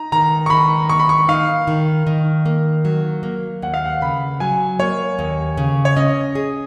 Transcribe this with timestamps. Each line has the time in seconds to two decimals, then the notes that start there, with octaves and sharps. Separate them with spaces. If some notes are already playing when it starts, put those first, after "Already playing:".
Already playing: D#4 A#5
0.12 D#3 A#5
0.46 C#6
0.50 D#3 B5
0.89 A#3 C#6
0.99 B5
1.09 C#6
1.29 D#4 F5
1.67 D#3
2.07 D#3
2.46 A#3
2.85 F#3
3.23 A#3
3.62 D#2 F#5
3.74 F5
3.86 F#5
4.02 C#3 B5
4.40 F#3 G#5
4.79 A#3 C#5
5.19 D#2
5.57 C#3
5.85 C#5
5.96 C#4 D#5
6.35 G#4